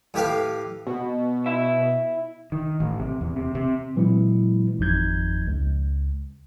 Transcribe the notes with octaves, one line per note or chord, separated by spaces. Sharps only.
A2 G4 B4 F5
B2
E4 E5
D#3
A1
C3
E2
C3
C3
A#2 E3 F#3 G#3 C4 E4
G#1 F2 F3 D#4 G6 G#6
C#2